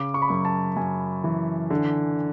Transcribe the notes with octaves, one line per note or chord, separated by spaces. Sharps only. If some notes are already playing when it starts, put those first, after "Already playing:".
Already playing: C#3 D6
C#6
B5
F#2 C#6
A5
F#2 G#5
E3
D3